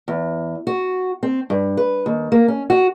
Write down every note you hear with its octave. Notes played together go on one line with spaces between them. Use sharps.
E2
F#4
C4
G2
B4
D#2
A#3
C#4
F#4